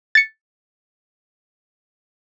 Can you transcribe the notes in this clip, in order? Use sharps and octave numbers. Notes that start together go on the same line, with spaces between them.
A6 C#7